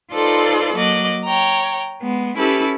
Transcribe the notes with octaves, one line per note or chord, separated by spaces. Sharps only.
D#4 F4 A4 B4 C5 D5
F#3 A#3 D#5 D6 F#6
C#5 G5 A#5
G#3 B3
C#4 E4 G4 A4 B4